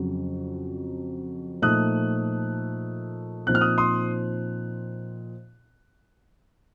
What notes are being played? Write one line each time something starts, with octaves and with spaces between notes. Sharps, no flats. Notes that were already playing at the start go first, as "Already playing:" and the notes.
Already playing: F2 C#3 F#3
A#2 F3 A3 D#4 D#6 F#6
A#2 F3 C4 D#4 F#6
F6
D#6 F#6
C6 D#6